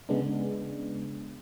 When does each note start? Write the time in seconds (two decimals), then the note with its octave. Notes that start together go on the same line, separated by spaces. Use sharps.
0.09 C#3 G#3 B3 D4